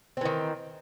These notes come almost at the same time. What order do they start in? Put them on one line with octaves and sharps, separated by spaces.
C4 E3 D#3